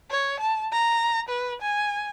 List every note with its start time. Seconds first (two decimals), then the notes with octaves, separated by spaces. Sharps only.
0.10 C#5
0.40 A5
0.73 A#5
1.29 B4
1.62 G#5